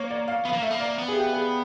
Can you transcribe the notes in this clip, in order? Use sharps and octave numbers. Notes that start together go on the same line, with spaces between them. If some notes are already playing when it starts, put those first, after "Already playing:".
Already playing: A#3 C#5
D5
F5
B3 F5
A#3
A3 E5
A#3
D5
B3
G#4
G4
G#4